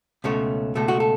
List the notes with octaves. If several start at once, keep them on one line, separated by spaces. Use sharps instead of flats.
C#2 B2 A3 C#4 C#5
C#2 B2 A3 A4
F#4
A4